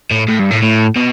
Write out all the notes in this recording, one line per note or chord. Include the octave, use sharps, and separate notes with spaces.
A2
A2
G2
A2
A2
B2